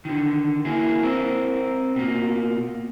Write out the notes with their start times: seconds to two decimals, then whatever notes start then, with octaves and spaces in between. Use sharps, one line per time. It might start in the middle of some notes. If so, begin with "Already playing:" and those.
0.05 D3 D#3
0.65 A#3 E4 G#4
1.03 C4 A#4
1.96 B2 A#3